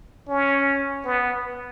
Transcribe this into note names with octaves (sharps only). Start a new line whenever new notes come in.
C#4
B3